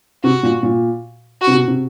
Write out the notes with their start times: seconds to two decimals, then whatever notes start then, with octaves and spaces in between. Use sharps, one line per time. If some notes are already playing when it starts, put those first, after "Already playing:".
0.24 C3 F#4
0.43 A#2
0.63 A#2
1.42 F#4
1.47 C3
1.54 B2
1.68 C3